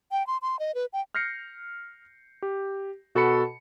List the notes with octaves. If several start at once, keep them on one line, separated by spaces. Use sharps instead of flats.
G5
C6
C6
D#5
B4
G5
F6 G6 A#6 C7 C#7
G4
B2 F#4 A4 A5 B5 C#7